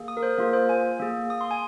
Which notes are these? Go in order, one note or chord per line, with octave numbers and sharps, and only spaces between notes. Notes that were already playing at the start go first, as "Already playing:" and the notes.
Already playing: A#3 G#4
D#6
A#4
C5
A#3 F4 G#4 A#4
C5
G#5
A#3 G#4
D#6
C6
G#5